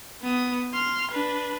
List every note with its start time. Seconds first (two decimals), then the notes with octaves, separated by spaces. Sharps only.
0.22 B3 D#6
0.73 C6 F6
1.11 D4 B4